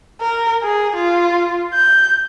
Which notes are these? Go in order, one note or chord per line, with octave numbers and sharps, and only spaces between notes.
A#4
G#4
F4
G6